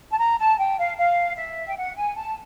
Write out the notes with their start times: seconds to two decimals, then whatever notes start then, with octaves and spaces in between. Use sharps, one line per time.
0.11 A5
0.19 A#5
0.39 A5
0.59 G5
0.78 F5
0.97 F5
1.37 E5
1.67 G5
1.76 F#5
1.96 G#5
2.16 A5